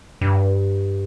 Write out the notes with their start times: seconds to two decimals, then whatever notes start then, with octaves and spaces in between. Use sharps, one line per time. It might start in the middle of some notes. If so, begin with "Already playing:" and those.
0.21 G2